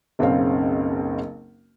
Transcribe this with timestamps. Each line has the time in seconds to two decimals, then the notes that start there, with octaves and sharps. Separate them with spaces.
0.19 F#1 B1 C#3 C4 F5